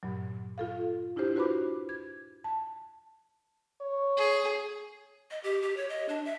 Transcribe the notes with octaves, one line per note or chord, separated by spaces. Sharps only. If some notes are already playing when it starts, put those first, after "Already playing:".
G2 A#2 F#3
F4 A4 F5
D4 E4 F4 G4 C5
E4 F#4 B4 C5 B5 D6
G#6
A5
C#5
G#4
D#5
G4
G4
C#5
D#5
D4
E5